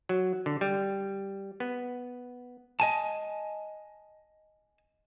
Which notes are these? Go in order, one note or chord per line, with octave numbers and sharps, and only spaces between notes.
F#3
D3
G3
B3
D#5 G#5 A5